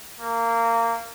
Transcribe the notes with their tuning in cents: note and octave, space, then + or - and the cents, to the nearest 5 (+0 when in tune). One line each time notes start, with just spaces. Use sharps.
A#3 -20